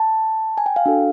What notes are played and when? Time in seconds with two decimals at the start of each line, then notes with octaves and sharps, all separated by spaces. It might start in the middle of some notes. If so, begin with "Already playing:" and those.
Already playing: A5
0.58 G#5
0.66 G5
0.76 F5
0.86 D4 F#4 A4